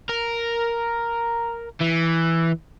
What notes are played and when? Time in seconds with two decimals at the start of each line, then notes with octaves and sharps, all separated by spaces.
0.09 A#4
1.81 E3